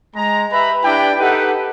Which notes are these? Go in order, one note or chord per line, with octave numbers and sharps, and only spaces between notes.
G#3 A#5
G4 B4 E5 A#5 B5
D4 E4 G4 B4 D5 G5
D#4 G4 A4 B4 F#5